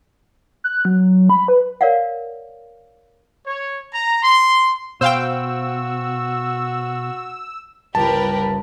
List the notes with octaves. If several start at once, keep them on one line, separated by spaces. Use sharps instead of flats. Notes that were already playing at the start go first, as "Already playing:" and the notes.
F#6
F#3
B5
B4
A#4 C#5 D5 F5 F#5
C#5
A#5
C6
B2 F#4 C5 F5 G5 E6
G1 C#2 G4 A#4 B4 A5